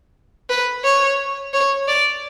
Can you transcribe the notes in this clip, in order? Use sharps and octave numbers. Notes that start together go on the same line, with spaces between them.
B4
C#5
C#5
D5